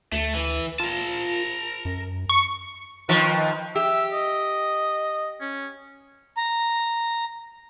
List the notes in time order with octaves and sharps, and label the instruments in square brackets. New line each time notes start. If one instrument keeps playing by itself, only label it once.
[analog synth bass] D2 [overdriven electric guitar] A3
[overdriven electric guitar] E3
[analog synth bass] F4 [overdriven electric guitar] A#4 A5
[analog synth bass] F#2
[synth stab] C#6
[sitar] D#3 F3 [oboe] B4
[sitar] G4 [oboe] E5
[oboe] D#5
C#4
[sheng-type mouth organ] A#5